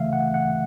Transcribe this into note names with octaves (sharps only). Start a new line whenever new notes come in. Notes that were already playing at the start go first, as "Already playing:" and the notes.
Already playing: C#3 E3 A3 E5 F5
F#5
F#5